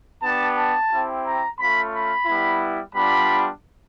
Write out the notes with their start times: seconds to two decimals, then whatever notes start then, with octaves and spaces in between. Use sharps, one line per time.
0.22 B3 D4 G4 A5
0.56 A5
0.90 C4 E4 G4
1.24 A#5
1.58 A3 C#4 F4 B5
1.92 B5
2.26 G3 B3 E4
2.94 G3 B3 D4 F4 B5